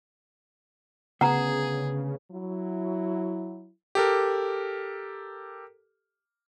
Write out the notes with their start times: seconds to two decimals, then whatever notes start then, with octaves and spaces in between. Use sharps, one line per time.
1.21 D2 C#3 B3 G#4 F#5 A#5
2.31 F#3 E4
3.95 G4 A4 A#4